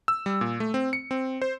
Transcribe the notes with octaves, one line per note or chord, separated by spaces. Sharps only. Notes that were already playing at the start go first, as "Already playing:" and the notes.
E6
G3
A#2
A3
C4
C#7
C4
C5